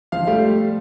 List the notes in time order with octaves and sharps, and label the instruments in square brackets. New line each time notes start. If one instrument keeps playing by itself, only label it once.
[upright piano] F3 [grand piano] F5
[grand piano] G3 [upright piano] A3